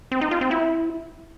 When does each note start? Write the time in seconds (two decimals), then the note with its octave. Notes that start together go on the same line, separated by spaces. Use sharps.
0.11 C4
0.21 D#4
0.31 F4
0.41 C4
0.51 E4